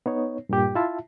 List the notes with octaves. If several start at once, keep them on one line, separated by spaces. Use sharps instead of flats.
B3 D#4 C#5
G2 A#2 G4
E4 F4 E5 A5